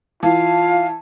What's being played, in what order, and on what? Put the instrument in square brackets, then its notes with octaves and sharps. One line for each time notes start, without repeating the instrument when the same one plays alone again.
[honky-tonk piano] E3 [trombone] F4 [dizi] F5 [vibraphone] A5